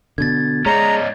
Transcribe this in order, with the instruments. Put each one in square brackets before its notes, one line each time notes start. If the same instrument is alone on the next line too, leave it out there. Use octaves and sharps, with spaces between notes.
[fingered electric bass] B2 D3 [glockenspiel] G#6 A6
[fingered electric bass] G#3 [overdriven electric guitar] C#4 D#4 [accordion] A#5